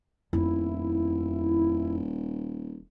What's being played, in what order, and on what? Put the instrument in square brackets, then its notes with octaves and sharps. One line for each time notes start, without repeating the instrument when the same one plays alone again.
[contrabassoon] D#1 [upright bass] F2 B3 [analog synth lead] E4